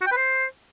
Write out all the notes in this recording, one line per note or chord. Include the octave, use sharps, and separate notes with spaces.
F#4
G5
B4
C5